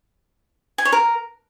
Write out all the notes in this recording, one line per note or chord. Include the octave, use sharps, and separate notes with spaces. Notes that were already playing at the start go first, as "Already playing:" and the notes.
G#5
C#5
A#4